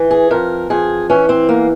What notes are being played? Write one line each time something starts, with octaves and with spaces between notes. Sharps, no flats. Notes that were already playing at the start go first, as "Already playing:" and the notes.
Already playing: E3
G#4
F2 A#4
F2 G#4
E3 C#4
C4
E2 A#3